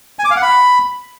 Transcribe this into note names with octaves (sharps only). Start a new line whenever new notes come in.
G#5
D6
F5
F#5
B5